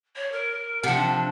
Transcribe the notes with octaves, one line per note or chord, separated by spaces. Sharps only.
C#5
A#4
C3 F3 F#5
D4